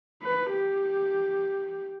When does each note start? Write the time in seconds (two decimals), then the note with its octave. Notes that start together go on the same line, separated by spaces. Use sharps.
0.22 B4
0.53 G4